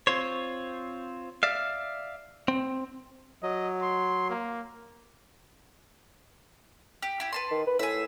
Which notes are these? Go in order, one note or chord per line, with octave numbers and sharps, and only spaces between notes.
C4 F4 C5 C#5
D5 E5 F5
C4
F#3 D#5
C6
A#3
G4
E4 G4
B4 A5 C6
D#3
B4
A2 G#4 E5